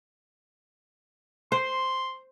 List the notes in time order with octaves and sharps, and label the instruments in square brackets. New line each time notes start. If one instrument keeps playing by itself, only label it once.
[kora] C5 [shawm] C6